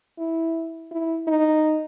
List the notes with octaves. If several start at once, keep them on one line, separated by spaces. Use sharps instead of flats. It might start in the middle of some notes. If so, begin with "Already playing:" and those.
E4
E4
D#4